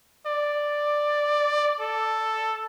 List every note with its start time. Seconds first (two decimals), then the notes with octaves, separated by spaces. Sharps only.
0.26 D5
1.80 A4